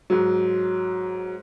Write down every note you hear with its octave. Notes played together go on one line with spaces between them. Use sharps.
G#2 F#3